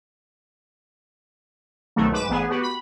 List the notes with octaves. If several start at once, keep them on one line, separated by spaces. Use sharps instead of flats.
C2 B2 D#3 F#3 A3
G#2 B4 D6 E7
A1 B3 G#4
B3 F#4 G4 B4
B5